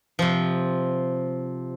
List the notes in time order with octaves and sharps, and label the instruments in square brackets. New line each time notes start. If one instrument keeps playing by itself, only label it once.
[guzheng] C3 F3